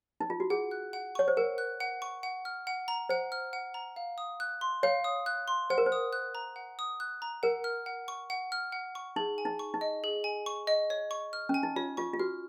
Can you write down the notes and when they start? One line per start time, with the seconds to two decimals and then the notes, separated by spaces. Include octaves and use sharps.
0.20 D#4
0.30 F4
0.40 F#4
0.50 G#4 F#5
0.71 F#6
0.93 F#5
1.15 C#5 C#6
1.28 C5
1.37 A#4 F#5
1.58 F#6
1.80 F#5
2.02 C#6
2.23 F#5
2.45 F6
2.67 F#5
2.88 A#5
3.09 C5 F#5
3.32 F6
3.53 F#5
3.74 A#5
3.96 F5
4.18 D#6
4.40 F#6
4.61 C6
4.83 C#5 F5
5.04 D#6
5.26 F#6
5.48 C6
5.70 C5 F#5
5.78 A#4
5.86 C5
5.92 D#6
6.13 F#6
6.35 A#5
6.56 F#5
6.79 D#6
7.00 F#6
7.22 A#5
7.43 A#4 F#5
7.64 F6
7.86 F#5
8.08 C#6
8.30 F#5
8.52 F6
8.72 F#5
8.95 C#6
9.16 D#4 G#4
9.38 G#5
9.45 D#4
9.59 C#6
9.74 D#4
9.81 D#5
10.04 G#4
10.24 G#5
10.46 C#6
10.67 D#5
10.90 C#5
11.11 C#6
11.33 F6
11.49 C#4 G#5
11.63 D#4
11.76 F4 C#5
11.97 F4 C#6
12.14 F4
12.19 F#4 F6